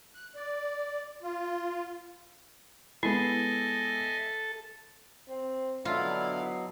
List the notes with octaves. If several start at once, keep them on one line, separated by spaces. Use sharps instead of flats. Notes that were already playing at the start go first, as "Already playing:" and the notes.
F#6
D5
F4
G#3 B3 E4 A4 D#5 E5 G#5
C4
B2 D3 F#3 B3 D4 E4 F4 F5